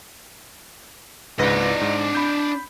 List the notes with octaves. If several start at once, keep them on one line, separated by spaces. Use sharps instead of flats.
C#2 G#2 D4 B4 D#5
G#2
B5 G6